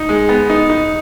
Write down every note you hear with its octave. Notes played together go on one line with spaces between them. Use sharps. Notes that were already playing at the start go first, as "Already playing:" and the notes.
Already playing: D#4
G#3
B3
D#4
D#4